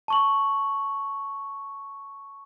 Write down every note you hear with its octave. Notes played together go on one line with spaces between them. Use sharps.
A5 C#6 F#7